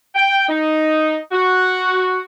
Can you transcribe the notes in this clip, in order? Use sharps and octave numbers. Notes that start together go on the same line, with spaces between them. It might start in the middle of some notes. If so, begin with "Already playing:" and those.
G5
D#4
F#4